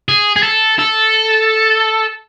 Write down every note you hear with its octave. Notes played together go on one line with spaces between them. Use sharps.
G#4
G#4
A4
A4